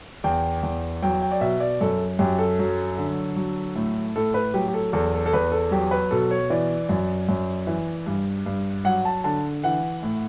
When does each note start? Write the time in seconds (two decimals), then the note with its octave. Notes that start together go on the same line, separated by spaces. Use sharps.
0.24 E2 G5
0.63 E2
1.03 F#3 G5
1.22 G5
1.32 D5
1.41 B2 E5
1.60 D5
1.81 F#2 A4
2.19 F#2 G4
2.38 A4
2.59 F#3
2.97 D3
3.36 F#3
3.75 A2
4.16 A2 A4
4.34 B4
4.54 F#3 G4
4.68 G4
4.74 A4
4.93 E2 A4
5.14 A4
5.26 A4
5.33 E2 B4
5.52 A4
5.71 F#3 G4
5.91 B4
6.11 B2 A4
6.31 C#5
6.50 E3 D5
6.89 F#2
7.29 F#2
7.67 E3
8.06 G2
8.46 G2
8.85 F#3 F#5
9.05 A5
9.24 D3 A5
9.64 E3 F#5
10.03 A2